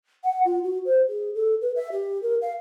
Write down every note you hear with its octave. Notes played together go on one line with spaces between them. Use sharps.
F#5
F4
F#4
C5
G#4
A4
B4
E5
G4
A#4
F5